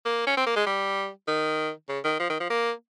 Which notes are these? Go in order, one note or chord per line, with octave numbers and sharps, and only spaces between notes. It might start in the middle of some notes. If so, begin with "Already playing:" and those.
A#3
C#4
C4
A#3
G#3
G3
D#3
C#3
D#3
F3
D#3
F3
A#3